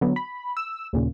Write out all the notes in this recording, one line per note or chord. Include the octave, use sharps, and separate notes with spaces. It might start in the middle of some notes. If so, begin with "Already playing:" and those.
D3 F#3 B3
B5
E6
D#2 A#2 C#3